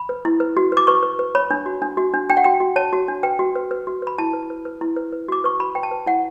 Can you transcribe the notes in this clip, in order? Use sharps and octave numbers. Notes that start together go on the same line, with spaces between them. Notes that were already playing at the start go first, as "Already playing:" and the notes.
Already playing: B5
B4
E4
B4
F#4
B4 D6
B4 C#6
B4
B4
C#5 B5
D4
F#4
D4
F#4
D4
D4 G5
F#5
F#4 G5
F#4
C#5 A5
F#4
D4
B4 G5
F#4
B4
B4
F#4
B4 B5
E4 A5
B4
B4
B4
E4
B4
B4
F#4 D6
B4 C#6
F#4 B5
B4 G5
A5
B4
E4 F#5